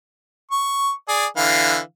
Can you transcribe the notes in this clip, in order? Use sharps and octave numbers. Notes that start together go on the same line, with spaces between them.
C#6
G#4 D5
D3 E3 F5